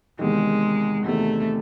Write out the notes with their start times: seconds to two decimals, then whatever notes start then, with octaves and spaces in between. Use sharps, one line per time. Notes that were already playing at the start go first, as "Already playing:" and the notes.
0.19 E2 C3 D#3 G#3
1.05 E2 C3 D#3 A3